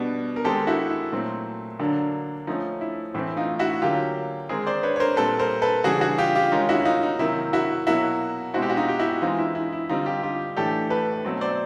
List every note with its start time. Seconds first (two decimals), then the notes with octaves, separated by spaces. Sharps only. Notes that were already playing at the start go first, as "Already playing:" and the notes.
Already playing: B2 G3 B3 D4
0.36 A#4
0.44 D#3 G#3 C4 G4 A4
0.67 E4 F#4
0.90 E4
1.12 A#2 F#3 A3 C4
1.80 D3 F#3 A#3 D4
2.47 F3 A3 C#4 D#4
2.81 E4
3.14 A2 E3 A3 C4 E4
3.37 D#4 F4
3.59 E4 F#4
3.82 D3 F#3 A#3 C#4 F4 G4
4.49 D#3 G#3 C4 G#4 A#4
4.67 C5 D5
4.83 B4 C#5
4.96 C#5
5.00 A#4 C5
5.16 A#2 G3 C4 A4 B4
5.39 A#4 C5
5.62 A4 B4
5.84 C#3 E3 G3 F#4 G#4
6.01 F#4 G#4
6.18 F4 G4
6.35 F4 G4
6.52 D#3 G#3 C#4 D#4 F4
6.69 E4 F#4
6.85 D#4 F4
7.03 D#4
7.19 C3 D#3 F#3 A#3 E4
7.53 E4 F#4
7.87 B2 F#3 A#3 E4 F#4
8.54 B2 G#3 C4 E4 F#4
8.62 G4
8.70 F#4
8.77 D#4 F4
8.88 G4
8.99 E4 F#4
9.22 E3 G#3 C4 D#4 F4
9.38 E4
9.55 E4
9.73 E4
9.89 D3 G3 C4 D#4 F4
10.06 F4 G4
10.23 F4 G4
10.56 A2 E3 A3 D4 G4 A4
10.90 A4 B4
11.24 B2 F#3 A3 C4
11.41 C5 D5